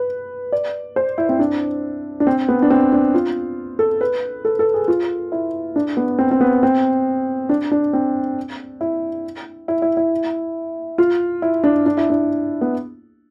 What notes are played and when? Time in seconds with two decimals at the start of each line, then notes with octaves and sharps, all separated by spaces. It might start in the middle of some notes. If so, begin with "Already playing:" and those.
Already playing: B4
0.52 D5
0.96 C5
1.18 E4
1.29 C4
1.39 D4
2.20 D4
2.27 C4
2.49 B3
2.62 D4
2.70 C4
2.92 D4
3.14 F4
3.79 A4
4.01 B4
4.45 A4
4.59 A4
4.74 G#4
4.88 F4
5.32 E4
5.76 D4
5.97 B3
6.19 C4
6.31 C4
6.41 B3
6.63 C4
7.49 D4
7.71 D4
7.93 C4
8.81 E4
9.68 E4
9.82 E4
9.97 E4
10.98 F4
11.42 E4
11.64 D4
11.86 D4
11.97 E4
12.10 D4
12.61 B3